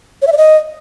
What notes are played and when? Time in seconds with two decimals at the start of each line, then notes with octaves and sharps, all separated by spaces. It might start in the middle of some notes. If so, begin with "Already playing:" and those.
0.22 C#5
0.27 E5
0.32 D5
0.37 D#5